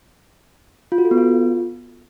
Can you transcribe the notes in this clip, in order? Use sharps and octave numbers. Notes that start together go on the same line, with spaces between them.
F4
F#4
A4
B3
F4